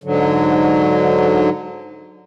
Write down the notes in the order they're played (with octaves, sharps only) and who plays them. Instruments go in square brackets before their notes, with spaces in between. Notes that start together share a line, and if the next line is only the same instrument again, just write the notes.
[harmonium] G#2 D3 F#3